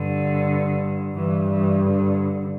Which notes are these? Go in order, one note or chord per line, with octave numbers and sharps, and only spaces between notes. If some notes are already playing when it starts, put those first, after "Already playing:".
Already playing: G2 D3
G2 E3
E3
D3